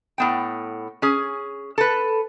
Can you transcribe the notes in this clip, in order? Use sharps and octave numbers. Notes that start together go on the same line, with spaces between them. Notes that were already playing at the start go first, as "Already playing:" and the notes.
A2 B3 G5
C#4 G#4
A4 B4